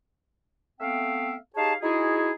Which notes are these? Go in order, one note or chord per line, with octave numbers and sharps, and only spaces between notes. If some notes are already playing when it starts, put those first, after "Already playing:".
A3 B3 C4 E5 F5 G5
D#4 G4 G#4 C#5 F5 A5
D#4 E4 F#4 G#4